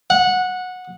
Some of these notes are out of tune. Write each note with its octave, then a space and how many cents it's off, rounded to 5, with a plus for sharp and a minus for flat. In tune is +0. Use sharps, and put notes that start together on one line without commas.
F#5 -15